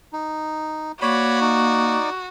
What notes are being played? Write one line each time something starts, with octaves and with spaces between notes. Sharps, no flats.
D#4
A#3 F#4 C#5 D5 B5
D#4 D5